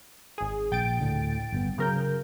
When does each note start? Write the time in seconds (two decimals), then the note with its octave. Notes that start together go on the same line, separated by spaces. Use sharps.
0.38 G#1 G#4
0.72 A#1 G5 A6 D7
1.00 D2 A2 D3
1.53 G1 B2 B3
1.78 C#3 F#3 A#4 G6